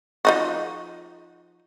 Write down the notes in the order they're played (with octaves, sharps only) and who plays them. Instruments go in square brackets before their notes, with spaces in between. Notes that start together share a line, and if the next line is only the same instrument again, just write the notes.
[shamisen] F3 D#4 F#4